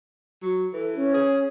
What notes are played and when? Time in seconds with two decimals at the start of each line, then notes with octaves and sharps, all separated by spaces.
0.42 F#3
0.73 E3 A4
0.96 C#4
1.14 G#4